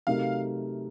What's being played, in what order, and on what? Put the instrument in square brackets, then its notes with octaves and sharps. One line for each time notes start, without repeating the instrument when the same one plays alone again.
[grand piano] C3 F#3 A3 D#4 A#4 [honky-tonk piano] F5